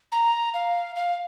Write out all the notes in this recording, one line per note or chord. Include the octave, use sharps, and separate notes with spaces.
A#5
F5
F5